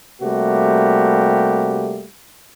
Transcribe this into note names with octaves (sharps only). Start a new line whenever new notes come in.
C3 G3 A3 A#3 F#4 G4